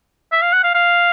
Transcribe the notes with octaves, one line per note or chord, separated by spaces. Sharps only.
E5
F5
F#5
F5
F5